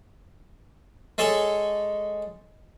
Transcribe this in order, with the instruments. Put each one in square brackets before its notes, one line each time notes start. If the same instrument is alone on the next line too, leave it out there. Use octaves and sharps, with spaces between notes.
[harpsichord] G#3 A4 C#5